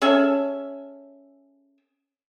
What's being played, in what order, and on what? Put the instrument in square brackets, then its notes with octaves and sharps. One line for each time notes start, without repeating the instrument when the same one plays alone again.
[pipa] C#4 G#4 A4 E5